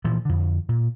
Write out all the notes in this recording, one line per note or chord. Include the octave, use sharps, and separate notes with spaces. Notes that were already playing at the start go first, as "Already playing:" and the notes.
A#2 E3 F3
F2 D3
A#2